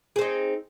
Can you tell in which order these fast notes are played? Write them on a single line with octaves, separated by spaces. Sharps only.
G#4 C4 D#4